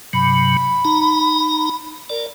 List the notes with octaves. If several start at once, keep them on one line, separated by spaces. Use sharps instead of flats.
G2 C3 F#3 B5
D#4 A#5
A#4 D5